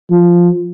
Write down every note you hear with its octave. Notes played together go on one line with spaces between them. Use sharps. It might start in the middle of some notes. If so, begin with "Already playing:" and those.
F3